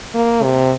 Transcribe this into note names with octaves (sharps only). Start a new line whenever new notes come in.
A#3
C3